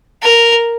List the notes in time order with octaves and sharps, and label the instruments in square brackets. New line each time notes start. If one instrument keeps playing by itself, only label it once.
[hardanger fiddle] A#4